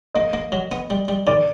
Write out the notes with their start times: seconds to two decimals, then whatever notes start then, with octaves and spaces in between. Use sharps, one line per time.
0.14 A#3 D#5
0.33 A#3
0.52 F#3
0.72 B3
0.90 G3
1.08 G3
1.27 D#3 D5